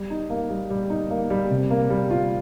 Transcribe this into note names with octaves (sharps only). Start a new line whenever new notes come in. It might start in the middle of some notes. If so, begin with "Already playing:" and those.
Already playing: G3
D#4
A#3
G3
G3
D#4
A#3
G3
C3
A#3
G3
F4